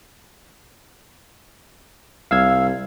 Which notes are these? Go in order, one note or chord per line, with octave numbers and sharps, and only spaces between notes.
C2 F5 E6 G#6